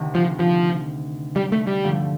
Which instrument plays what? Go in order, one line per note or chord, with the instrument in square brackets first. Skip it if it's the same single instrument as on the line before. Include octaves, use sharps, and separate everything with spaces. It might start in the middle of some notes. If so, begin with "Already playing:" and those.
Already playing: [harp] D2 C3 D#3
[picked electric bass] F3
F3
G3
A3
G3
[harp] G2 D3 F3 A3